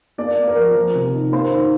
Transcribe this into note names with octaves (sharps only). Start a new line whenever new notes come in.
A#3 D5
A#3
A#4
F3
F3
C3
D#4
A#3 C5
D#3